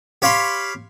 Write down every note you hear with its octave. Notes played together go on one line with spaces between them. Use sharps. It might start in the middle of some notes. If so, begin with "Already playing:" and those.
G4 C#5 F5 B5 C6